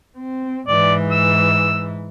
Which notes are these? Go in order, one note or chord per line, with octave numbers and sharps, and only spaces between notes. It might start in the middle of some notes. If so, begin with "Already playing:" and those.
C4
G#2 E3 D5
E6